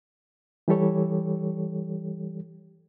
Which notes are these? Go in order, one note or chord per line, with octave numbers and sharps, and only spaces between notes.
E3 G3 G4 A4 C#5